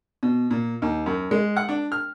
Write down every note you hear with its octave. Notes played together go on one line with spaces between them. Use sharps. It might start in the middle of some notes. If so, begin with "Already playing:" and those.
B2
A#2
D#2
F#2
G#3
F#5
D4
F6